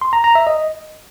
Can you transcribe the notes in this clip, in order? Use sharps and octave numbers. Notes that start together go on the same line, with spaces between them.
C6
A#5
A#5
E5
D#5